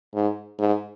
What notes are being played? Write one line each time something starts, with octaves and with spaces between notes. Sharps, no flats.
G#2
G#2